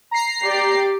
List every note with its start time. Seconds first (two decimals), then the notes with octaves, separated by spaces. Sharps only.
0.11 A#5 C7
0.43 G4 D5